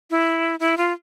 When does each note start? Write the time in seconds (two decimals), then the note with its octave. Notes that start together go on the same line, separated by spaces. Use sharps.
0.10 E4
0.60 E4
0.78 F4